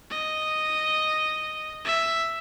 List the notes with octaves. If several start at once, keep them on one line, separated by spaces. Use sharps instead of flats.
D#5
E5